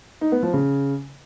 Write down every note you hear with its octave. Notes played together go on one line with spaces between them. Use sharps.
D#4
B3
F3
C#3